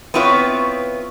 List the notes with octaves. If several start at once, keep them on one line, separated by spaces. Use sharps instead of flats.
B3 C4 E4 F4 B4 C#5